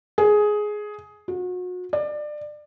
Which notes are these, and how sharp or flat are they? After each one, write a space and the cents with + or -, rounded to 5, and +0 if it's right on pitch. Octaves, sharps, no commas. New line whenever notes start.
G#4 +10
F#4 -35
D5 +25